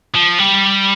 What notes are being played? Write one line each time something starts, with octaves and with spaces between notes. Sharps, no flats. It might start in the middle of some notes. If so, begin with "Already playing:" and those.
F3
G3